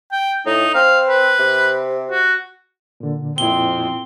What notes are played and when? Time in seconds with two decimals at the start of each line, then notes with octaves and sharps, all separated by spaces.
0.12 G5
0.46 A2 D#4
0.75 C4 F5
1.08 B4
1.39 C3
2.10 F#4
3.00 A#2 D3
3.38 F2 A#2 C4 E4 G7